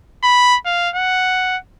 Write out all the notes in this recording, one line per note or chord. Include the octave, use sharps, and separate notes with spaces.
B5
F5
F#5